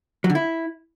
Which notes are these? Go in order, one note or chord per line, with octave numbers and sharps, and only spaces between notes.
F#3
D3
E4